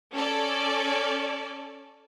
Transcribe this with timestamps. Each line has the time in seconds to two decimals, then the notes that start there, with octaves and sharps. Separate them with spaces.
0.13 C#4 A4 D5